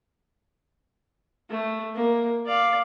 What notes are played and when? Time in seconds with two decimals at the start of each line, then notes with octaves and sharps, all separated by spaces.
1.50 A3
1.95 A#3
2.46 D5 F5